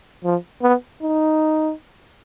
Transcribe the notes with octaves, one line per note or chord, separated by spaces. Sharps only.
F3
B3
D#4